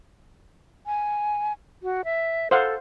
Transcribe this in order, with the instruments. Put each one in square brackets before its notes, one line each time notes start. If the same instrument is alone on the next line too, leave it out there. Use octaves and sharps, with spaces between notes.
[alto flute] G#5
F#4
E5
[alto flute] A4 [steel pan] C5 F5 F#5